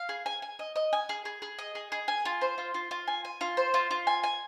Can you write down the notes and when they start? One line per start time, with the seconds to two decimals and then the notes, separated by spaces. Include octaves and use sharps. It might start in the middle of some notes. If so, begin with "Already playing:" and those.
Already playing: F5
0.09 G#4
0.26 G#5
0.42 G#5
0.59 D#5
0.76 D#5
0.93 G#5
1.09 G#4
1.25 G#4
1.42 G#4
1.59 D#5
1.75 G#4
1.92 G#4
2.08 G#5
2.25 F4
2.41 C5
2.58 F4
2.74 F4
2.91 F4
3.08 G#5
3.25 G#5
3.41 F4
3.57 C5
3.74 F4
3.91 F4
4.07 G#5
4.24 G#5